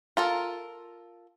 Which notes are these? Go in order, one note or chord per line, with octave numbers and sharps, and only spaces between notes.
F4 A4 A#4